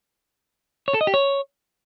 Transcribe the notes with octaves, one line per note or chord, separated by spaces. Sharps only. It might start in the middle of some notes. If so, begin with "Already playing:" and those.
C#5
A4
D#5
G4
C#5